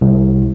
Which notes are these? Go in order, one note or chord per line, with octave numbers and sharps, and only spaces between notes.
C2